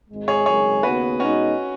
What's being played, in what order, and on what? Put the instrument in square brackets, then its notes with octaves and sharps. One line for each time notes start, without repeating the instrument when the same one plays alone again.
[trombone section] G#1 G#2 G#3
[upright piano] G#4 C#5
[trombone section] G#1 F#2 C#3 G#3 [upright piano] G#4 C#5
[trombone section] D#2 C#3 B3 [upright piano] F#4 B4
[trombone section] B2 G#3 D#4 [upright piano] C#4 F#4